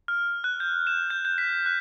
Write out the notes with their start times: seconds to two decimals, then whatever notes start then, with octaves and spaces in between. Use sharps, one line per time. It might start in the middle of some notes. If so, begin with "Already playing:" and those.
0.08 F6
0.44 F#6
0.60 G6
0.87 E7
1.10 G6
1.25 G6
1.38 B6
1.66 F#6